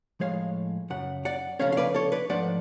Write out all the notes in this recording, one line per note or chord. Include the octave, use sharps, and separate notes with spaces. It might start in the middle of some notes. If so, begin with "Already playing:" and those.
A2 F3 G#3 C#5 F5
F#2 C#3 F#5
D5 F#5
C#3 F3 A3 C#4 C#5 F5
F5
B4 D5
A4 C#5
B4 D5
G#2 F3 A3 D4 D5 F#5